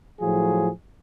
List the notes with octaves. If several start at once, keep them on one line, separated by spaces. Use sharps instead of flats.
A2 F3 F#3 F4 G#4